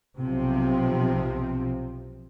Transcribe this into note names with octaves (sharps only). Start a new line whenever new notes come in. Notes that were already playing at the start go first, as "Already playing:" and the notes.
B1 C3 F3 C4